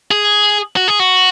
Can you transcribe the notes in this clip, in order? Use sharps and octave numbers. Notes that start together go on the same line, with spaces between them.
G#4
F#4
G#4
F#4